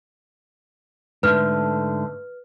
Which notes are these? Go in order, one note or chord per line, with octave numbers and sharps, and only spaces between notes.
G#2 D3 A3 B4 F6